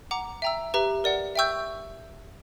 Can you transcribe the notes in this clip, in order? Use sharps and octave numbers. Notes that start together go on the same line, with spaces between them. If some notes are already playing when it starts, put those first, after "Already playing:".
F#5 A#5 D6
E5 G5 A#5 E6
G4 B4 E5 A#5
A#4 D5 F#5
E5 G5 C#6 E6 G6